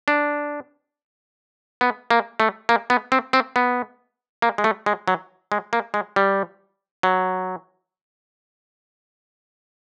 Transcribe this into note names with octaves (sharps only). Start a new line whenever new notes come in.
D4
B3
A#3
A3
A#3
B3
C4
C4
B3
A#3
G#3
A3
G#3
F#3
G#3
A#3
G#3
G3
F#3